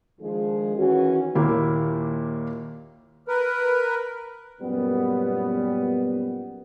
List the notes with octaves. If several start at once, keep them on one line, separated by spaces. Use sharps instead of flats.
D#3 F3 G#3 D4 G#4
D#3 E3 C#4 F#4
D#2 A#2 A#3 E4 G4
A#4 B4
F#2 A#2 G3 B3